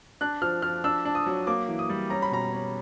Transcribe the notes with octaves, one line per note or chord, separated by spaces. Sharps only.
D4 F#6
F3 F6
F3 F6
D4 E6
D4
D#6
F#3
A#3 D6
E3
D#6
G3
C#4 A#5
B5
B2 A#5
C#4